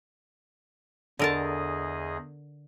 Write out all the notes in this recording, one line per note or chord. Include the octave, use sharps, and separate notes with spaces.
E2 D3 G#4 A#4 D#5 A5